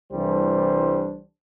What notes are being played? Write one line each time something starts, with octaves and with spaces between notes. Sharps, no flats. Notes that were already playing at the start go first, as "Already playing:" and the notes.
C2 E3 G3 A3 D4 C5